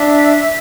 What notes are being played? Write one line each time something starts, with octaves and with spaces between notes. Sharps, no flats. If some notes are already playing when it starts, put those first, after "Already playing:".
Already playing: D4 E5